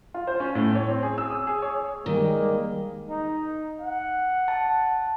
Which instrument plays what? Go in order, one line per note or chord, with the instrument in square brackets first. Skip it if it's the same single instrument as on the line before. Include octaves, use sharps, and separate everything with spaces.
[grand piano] F4
C5
C#4
A2
C#5
C4
G#4
E6
D#6
G#4
C#5
[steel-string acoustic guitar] D#3 [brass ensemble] G3 G#3 A#3
[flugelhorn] D#4
F#5
[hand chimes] A5